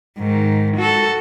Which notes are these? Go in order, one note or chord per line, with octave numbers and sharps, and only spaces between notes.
G#2 D#3
F#4 A4